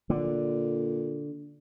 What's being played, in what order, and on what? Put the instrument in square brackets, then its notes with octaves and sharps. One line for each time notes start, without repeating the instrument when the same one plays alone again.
[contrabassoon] A#2 [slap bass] D3